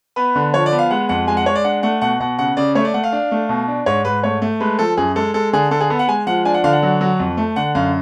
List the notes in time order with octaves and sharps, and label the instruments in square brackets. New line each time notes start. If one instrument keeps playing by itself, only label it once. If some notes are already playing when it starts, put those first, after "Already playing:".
[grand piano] B3 B4
D3
F3 C#5
D5
B3
F5
G#3 F#5
F2 F#5
G#3 G#5
F#5
G#3 C#5
D5
D4 F#5
A3 F#5
B2 F#5
B2 F#5
C#3 F#5
C#3 D5
A3 C#5
D5
A3 F#5
F5
D4
A3
B2
D4
G#2 C#5
G#2 B4
A3 C#5
A3
G#3 B4
F3 A4
F#2 G#4
G#3 A4
G#3 A4
D3 G#4
D3 A4
G#4
B3 A4
F#5
G#3 G#5
F3 F#5
D4 G#5
F#5
D3 F5
F#5
F#3
F#3
F2
A3
D3 F#5
F#2 F5